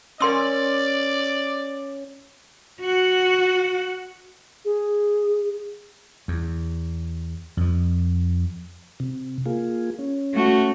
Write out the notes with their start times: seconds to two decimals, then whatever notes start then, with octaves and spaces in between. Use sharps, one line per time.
0.20 C#4 A#4 D5 C6 E6
2.81 F#4 F#5
4.65 G#4
6.28 E2
7.57 F2 F3
9.00 C3
9.46 A#3 F4 G#4
9.99 C#4
10.34 A3 F#4